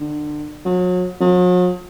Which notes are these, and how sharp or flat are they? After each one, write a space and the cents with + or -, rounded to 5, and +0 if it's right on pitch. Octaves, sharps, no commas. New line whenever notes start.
D3 +30
F#3 -35
F#3 -45